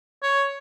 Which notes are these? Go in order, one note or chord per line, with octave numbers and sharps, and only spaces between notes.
C#5